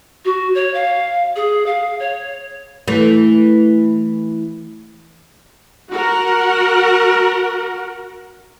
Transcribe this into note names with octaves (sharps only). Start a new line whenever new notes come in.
F#4
C#5
F5
G#4
F5
C#5
E3 A3
F#4 A#4 F#5